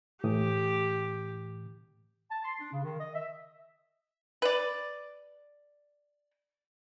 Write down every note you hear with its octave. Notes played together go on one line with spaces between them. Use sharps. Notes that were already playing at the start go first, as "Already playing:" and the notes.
A2 E3 G4 D#6
A5
C6
D4
C#3
D#3
D#5
E5
B4 D5